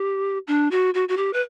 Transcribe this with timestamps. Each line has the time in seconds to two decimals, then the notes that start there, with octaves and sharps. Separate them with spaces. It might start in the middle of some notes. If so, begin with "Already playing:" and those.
Already playing: G4
0.47 D4
0.71 F#4
0.94 F#4
1.09 F#4
1.17 G4
1.33 B4